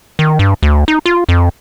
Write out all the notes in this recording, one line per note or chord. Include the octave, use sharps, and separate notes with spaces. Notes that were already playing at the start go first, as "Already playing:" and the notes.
D#3
G2
D2
D#4
F4
F2